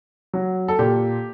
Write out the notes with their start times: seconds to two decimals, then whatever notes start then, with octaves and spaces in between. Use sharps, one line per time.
0.34 F#3
0.68 A4
0.79 A#2 G4